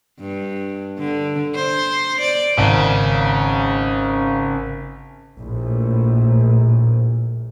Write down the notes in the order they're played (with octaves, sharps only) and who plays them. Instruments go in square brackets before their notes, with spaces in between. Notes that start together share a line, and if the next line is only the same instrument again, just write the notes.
[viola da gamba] G2
D3
C5
D5
[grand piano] G#1 [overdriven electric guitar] C#3
[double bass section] A#1 A2